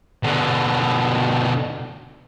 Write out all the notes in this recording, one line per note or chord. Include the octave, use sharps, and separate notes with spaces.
B2 D3